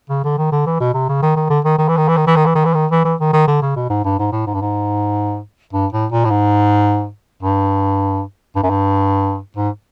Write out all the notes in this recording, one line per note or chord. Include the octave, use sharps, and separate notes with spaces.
C#3
D3
D#3
D3
E3
B2
C3
C#3
D#3
D#3
D3
D#3
D#3
E3
D#3
E3
D#3
E3
D#3
E3
D#3
E3
D#3
E3
E3
D#3
D#3
D3
C#3
B2
G#2
G2
G#2
A2
G#2
G2
G#2
G2
A2
A#2
A2
G#2
G2
G2
F#2
G2
G#2